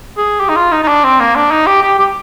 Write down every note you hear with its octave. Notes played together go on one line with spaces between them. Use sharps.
G#4
G4
D#4
F4
D#4
D#4
D4
C4
A#3
D4
D#4
G4
G4
G4